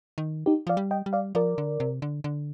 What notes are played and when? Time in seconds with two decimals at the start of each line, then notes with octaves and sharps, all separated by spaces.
0.18 D#3
0.46 D#4 G4
0.67 F3 D5 F5
0.77 G3
0.91 D#5 G5
1.06 G3
1.13 D5 F5
1.35 F3 A#4 D5
1.58 D3
1.80 C3
2.02 D3
2.24 D3